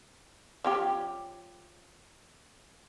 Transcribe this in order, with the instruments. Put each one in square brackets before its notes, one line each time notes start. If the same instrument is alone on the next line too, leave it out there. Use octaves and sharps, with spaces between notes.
[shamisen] F3 C#4 G4